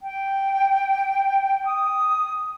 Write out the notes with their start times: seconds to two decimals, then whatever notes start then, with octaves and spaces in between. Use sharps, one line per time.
0.01 G5
1.66 D#6